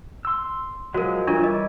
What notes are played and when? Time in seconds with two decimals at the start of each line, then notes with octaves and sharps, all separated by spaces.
0.25 C6 E6
0.94 F3 F#3 G#3 F#4 A#4
1.27 E3 G3 D4 F4 A#4 C#5
1.44 D#5